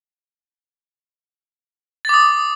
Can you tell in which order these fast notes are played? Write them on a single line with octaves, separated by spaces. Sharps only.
A6 D6 D#6